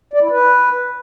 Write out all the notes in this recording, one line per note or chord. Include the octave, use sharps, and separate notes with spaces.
D5
E4
B4